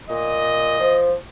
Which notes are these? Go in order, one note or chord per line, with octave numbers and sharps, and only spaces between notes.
A#2 D#5
F3